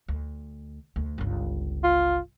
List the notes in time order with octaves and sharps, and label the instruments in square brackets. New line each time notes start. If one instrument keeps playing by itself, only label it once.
[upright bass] D2
D2
G1 C#2
[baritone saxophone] F4